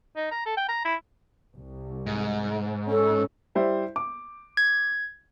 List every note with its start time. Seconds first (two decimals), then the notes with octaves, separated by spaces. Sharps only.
0.16 D#4
0.31 A#5
0.46 A4
0.57 G5
0.69 A#5
0.85 E4
1.55 C2
2.06 G#2
2.88 C#4 A4
3.55 G3 E4 C5
3.96 D6
4.57 G#6